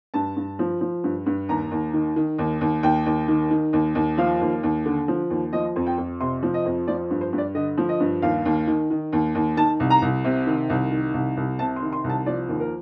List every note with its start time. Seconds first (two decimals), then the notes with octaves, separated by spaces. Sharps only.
0.14 G2 A5
0.36 G2
0.59 F3
0.81 F3
1.04 G2
1.26 G2
1.49 D#2 A#5
1.71 D#2
1.93 D#3
2.16 D#3
2.39 D#2
2.61 D#2
2.83 D#2 G5
3.06 D#2
3.28 D#3
3.51 D#3
3.73 D#2
3.95 D#2
4.18 F3 F5
4.41 D#2
4.63 D#2
4.86 D3
5.08 F3
5.30 D#2
5.53 F3 D#5
5.76 F2
5.87 G5
5.98 F2
6.20 C3 C6
6.43 F3
6.54 D#5
6.66 F2
6.88 F3 D5
7.10 G2
7.21 C5
7.33 G2
7.38 D5
7.55 D3 D#5
7.78 F3
7.89 D#5
8.00 G2
8.22 D#2 F5
8.45 D#2
8.67 D#3
8.90 D#3
9.13 D#2
9.35 D#2
9.57 D#3 A5
9.80 C2
9.90 A#5
10.02 C2
10.24 C3
10.47 D#3
10.70 C2
10.91 D#3
11.14 C2
11.37 C2
11.59 C3 A5
11.76 C6
11.82 D#3
11.93 C6
12.04 C2
12.10 A5
12.26 F3 D5
12.48 D#2
12.60 A#4